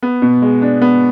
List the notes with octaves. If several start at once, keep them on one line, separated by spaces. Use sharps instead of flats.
B3
B2
G#3
D4
B3